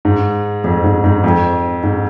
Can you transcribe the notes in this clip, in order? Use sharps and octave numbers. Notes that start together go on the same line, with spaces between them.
G#2
F2
G#2
G#2
F2
G#2